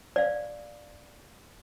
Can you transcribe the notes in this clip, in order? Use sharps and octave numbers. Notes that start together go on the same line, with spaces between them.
D5 F5